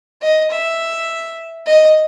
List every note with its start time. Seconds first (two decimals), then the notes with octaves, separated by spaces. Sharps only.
0.22 D#5
0.51 E5
1.66 D#5